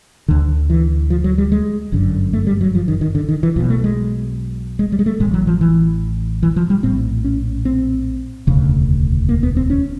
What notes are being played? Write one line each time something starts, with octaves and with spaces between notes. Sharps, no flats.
D2 D3
E3
F3
F#3
G3
G#3
G1 F#2 D3
A3
G3
F#3
F3
D#3
D#3
D3
D#3
E3
B1 B2 F3
A3
G#3
G#3
G3
G#3
A3
A1 A2 G#3
F#3
F3
E3
E3
F3
G3
A#1 A2 C4
C#4
C4
E1 D2 C#3
A#3
B3
C4
C#4